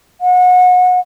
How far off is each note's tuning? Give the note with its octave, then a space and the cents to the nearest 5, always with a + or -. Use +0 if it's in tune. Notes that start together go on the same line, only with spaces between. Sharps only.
F#5 -30